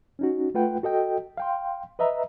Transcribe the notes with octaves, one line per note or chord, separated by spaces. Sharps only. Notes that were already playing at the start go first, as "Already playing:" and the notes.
C#4 D#4 F#4
A3 F4 B4 F#5 G5
F#4 A4 D#5 G5
F5 G5 C6
B4 D#5 E5 A#5